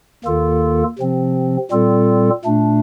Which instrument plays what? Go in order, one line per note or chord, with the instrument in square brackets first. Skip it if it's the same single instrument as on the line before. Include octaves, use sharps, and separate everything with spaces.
[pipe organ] D#2 D#3 A#3 F4 A4
C3 F3 C4
A#2 G3 C4 F4 A4
A#2 A3 D4